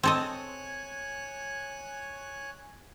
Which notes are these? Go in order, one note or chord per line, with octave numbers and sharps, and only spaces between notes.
C4 A4 C#5 D#5 G#5 F#6